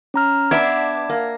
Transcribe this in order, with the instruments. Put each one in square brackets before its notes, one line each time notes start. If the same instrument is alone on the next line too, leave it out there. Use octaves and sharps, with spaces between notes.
[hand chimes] C#4 A#5 F6
[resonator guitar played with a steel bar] B3 D4 [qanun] D5 E5 [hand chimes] G#6
[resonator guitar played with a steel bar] A#3